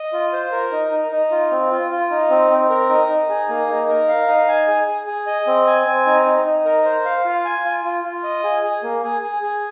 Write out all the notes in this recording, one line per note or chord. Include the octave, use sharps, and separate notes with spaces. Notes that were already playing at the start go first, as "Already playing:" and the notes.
Already playing: D#5
F4
C5
A#4
D#4
D#4
D#4
F4
C4
F4
F4
D#4
C4
C4
A#4
D#4
D#4
G#4
A#3
D#4
A#4
F5
D#4
G#5
G#4
G#4
G#4
D#5
C4
G#5
C4
D#4
D#4
D#4
A#4
C5
F5
F4
G#5
F4
F4
F4
D#5
G#4
G#4
A#3
G#4
G#4
G#4